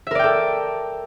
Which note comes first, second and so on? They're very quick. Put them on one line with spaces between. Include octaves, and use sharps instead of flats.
E5 A#4 D5 G5 A4